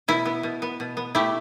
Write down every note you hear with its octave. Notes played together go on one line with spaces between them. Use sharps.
B2 E4
B3
B2
B3
B2
B3
A3 E4 G4